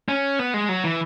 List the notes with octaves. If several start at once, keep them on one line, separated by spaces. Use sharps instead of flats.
C#4
B3
G#3
F#3
E3